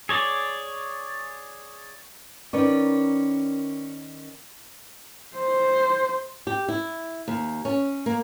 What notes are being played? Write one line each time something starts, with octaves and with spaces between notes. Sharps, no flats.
G#4 C#5 D5
D#3 C#4 A#4 B4 D5
C5
G4
E4
D#2
C#4
A#3